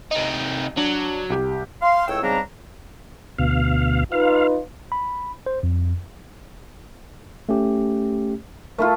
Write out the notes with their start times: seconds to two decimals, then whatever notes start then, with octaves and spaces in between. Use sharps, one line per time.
0.11 C3 D#4
0.77 F#3 D4
1.30 C2 G4
1.82 F5 C6
2.07 C#2 A2 C#5 G5 E6
2.22 G#2 C#3 G3 C4 D4 A#5
3.39 D2 B2 F5
4.12 D#4 F4 B4 F5
4.92 B5
5.46 C5
5.63 F2
7.49 A3 C#4 G4
8.78 A3 E4 F4 A#4